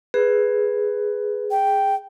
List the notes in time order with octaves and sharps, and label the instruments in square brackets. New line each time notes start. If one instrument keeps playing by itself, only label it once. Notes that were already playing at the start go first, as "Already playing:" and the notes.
[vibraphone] G#4 [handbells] B4
[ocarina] G5